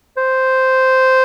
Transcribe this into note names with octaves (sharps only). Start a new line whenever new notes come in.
C5